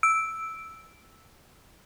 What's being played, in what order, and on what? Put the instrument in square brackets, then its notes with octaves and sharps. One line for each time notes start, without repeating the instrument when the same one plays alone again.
[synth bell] E6 D7